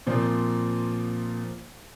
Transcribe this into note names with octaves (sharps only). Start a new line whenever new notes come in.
A#2 F3 C4